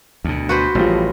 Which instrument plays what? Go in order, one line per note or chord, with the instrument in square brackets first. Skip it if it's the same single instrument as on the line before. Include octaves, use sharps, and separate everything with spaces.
[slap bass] D2 B2
[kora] F#4 B4 C5
[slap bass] A1 A2 [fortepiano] F3 G3 F4